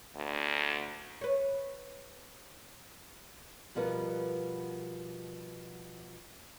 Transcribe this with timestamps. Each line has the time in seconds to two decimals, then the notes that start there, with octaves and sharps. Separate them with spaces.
0.16 D2
1.21 B4 C#5
3.75 B2 F3 G3 B3 A#4 B4